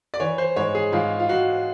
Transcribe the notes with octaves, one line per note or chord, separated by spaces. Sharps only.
D5
E3 C#5
C5
G#2 C#5
G#4
G#2 F4
F4
G#2 F#4